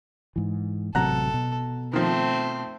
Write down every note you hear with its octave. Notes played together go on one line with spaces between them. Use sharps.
G#2 E3
A1 C3 F#3 A4 F#5 A#5
B2
D#3 F3 A3 C4